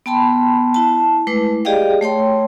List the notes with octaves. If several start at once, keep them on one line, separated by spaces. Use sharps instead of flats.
B3 G5 A5 B5 C6
E4 A5
G#3 A3 E4 B4 D6
G4 G#4 D5 D#5 F5 G5
A3 C#5 G5 C6